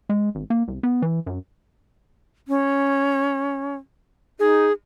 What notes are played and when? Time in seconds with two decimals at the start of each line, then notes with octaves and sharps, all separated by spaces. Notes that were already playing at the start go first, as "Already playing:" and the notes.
0.09 G#3
0.35 G#1
0.50 A#3
0.68 C2
0.83 B3
1.02 E3
1.26 F#2
2.48 C#4
4.40 D#4 G#4